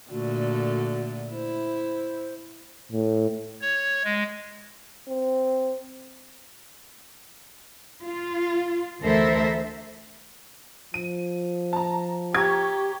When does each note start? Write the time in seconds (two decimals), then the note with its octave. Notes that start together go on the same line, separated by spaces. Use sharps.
0.10 A#2 D3 A3 F#4
1.31 E4 C5
2.92 A2
3.61 C#5
4.05 G#3
5.08 C4
8.03 F4
9.01 D2 E3 A4 A#4 C5 E5
10.94 F3 D#7
11.73 A5 A#5
12.34 G4 A#5 C#6 G#6